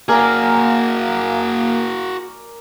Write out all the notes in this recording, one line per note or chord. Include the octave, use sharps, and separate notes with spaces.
A#3 F#4 G#4 A#4 D5 G#5